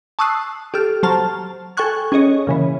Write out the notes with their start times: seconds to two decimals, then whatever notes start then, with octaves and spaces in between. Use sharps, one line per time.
0.19 A5 C#6 D#6 E6 F#6 C7
0.74 G4 A4 F6
1.03 F#3 C5 A5 A#5 F6
1.77 A4 G5 G#5 C#6 F#6 G#6
2.12 C#4 G#4 C#5 D#5
2.47 A#2 C#3 E3